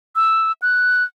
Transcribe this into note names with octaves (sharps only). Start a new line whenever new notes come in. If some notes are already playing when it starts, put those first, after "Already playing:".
E6
F#6